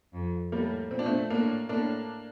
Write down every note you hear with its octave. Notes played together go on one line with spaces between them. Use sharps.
F2
A2 G3 A#3
A#2 C4
D4
A3 C4
A2 A#3 D4
A2 A#3 D4